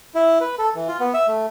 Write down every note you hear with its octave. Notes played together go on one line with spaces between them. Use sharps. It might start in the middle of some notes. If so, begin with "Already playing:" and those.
E4
B4
A4
E3
F4
B3
E5
A3